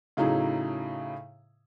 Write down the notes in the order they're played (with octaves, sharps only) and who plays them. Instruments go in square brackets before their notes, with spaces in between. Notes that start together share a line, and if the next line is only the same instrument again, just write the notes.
[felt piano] A2 C#3 F#3 D#4 E4 G#4